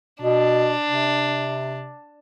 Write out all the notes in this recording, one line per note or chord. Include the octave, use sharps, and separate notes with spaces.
B2 D4
C3